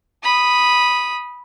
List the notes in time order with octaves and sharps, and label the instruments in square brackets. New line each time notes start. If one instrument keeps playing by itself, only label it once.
[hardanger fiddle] B5 D#6